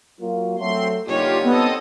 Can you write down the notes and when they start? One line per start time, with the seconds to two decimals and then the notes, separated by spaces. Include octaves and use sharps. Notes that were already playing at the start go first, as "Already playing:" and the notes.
0.20 F#3 A#3 F4
0.59 F#3 A3 C4 C6
1.06 A#2 D3 G3 D#4 F4 G4 C#5
1.43 B3 C4 A4 D#5